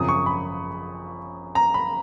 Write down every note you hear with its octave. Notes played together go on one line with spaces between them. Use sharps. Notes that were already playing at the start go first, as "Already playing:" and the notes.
Already playing: G#1 F#2 C#3 F3 D#6
C#6
B5
A#5
B5